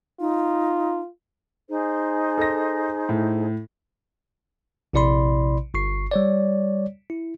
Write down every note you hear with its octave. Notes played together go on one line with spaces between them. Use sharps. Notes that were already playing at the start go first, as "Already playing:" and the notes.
D#4 F4
D#4 G#4 C5
A4 A#6
A2
A#1 C3 E4 D5 B5 C6
G1 C#6 C7
G3 C#5 D5
E4